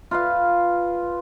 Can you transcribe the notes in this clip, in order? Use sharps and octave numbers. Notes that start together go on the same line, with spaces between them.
F4 B4 F5